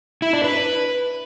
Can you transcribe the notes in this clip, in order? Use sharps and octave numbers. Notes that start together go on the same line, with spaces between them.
E4
D4
B4